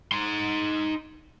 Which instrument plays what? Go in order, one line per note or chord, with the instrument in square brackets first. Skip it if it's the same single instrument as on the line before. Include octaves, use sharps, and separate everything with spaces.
[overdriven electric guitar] D#4 C6